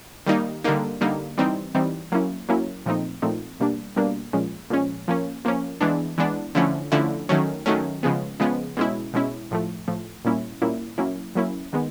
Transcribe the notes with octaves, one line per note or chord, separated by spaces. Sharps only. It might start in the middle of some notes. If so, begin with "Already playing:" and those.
D#3 G3 A#3 D#4
D3 G3 A#3 D#4
D3 G3 A#3 D#4
E3 G3 C4 D#4
E3 G3 C4 D#4
F#3 A#3 C#4 E4
F#3 A#3 C#4 E4
A#2 F3 A3 C4 D#4
A#2 F3 A3 C4 D#4
B2 G3 A#3 D4
B2 G3 A#3 D4
A#2 F3 G#3 C#4
A#2 F3 G#3 C#4
F3 A#3 C#4
F3 A#3 C#4
E3 G#3 B3 D4
E3 G#3 B3 D4
D3 F3 A3 C#4 E4
D3 F3 A3 C#4 E4
D#3 F#3 A3 C#4
D#3 F#3 A3 C#4
C#3 F3 G#3 B3
C#3 F3 G#3 B3
B2 G#3 C#4 E4
B2 G#3 C#4 E4
A2 F3 A3
A2 F3 A3
A#2 G3 A#3 C#4 E4
A#2 G3 A#3 C#4 E4
F#3 A#3 C#4 E4
F#3 A#3 C#4 E4
D#3 G#3 B3